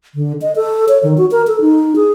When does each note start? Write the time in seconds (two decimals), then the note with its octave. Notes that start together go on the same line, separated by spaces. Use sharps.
0.15 D3
0.42 D#5
0.56 A4
0.88 C#5
1.03 D#3
1.18 F#4
1.31 A#4
1.47 A4
1.61 D#4
1.96 G#4